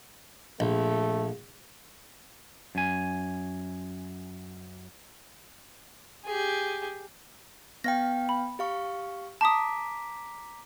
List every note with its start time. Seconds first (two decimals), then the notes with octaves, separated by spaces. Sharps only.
0.60 A#1 A3
2.75 F#2 G#5
6.25 G4 G#4
7.84 B3 F5 G5 A#6
8.29 B5
8.59 G4 F5 C#6
9.41 A5 A#5 D6 D#6 B6